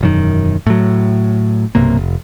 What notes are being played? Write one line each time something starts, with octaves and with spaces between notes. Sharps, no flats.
E1 F#2 D#3
A2 F#3
B1 G2 C3 A#3
F1